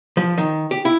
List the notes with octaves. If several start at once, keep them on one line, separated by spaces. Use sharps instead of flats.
F3
D#3
G4
E4